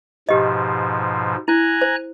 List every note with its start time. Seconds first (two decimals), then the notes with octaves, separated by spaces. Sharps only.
0.29 G#2 B2 F3 G4 D#5
1.48 E4 G#5 A#5 F#6
1.82 C5